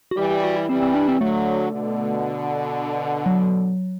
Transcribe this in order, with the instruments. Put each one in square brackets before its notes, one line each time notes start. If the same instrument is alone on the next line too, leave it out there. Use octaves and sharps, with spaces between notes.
[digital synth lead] F#4
[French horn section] E3 G3 [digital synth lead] G4
[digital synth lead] G4
F#4
E4
[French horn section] E3 G3 [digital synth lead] C4
[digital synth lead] C4
D4
C4
[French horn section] D3 F#3 [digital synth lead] A3
[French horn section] B2 D3
[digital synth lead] F#3